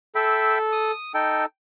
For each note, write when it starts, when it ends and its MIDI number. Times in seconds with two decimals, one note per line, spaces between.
0.15 0.91 69
0.15 0.58 76
0.15 0.58 79
0.15 0.58 83
0.72 1.12 87
1.14 1.46 63
1.14 1.46 69
1.14 1.44 79